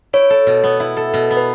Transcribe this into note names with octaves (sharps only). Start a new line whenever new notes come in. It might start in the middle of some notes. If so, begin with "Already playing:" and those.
E4 C#5
A4
B2
B3
E4 E5
A4
B2
B3
B4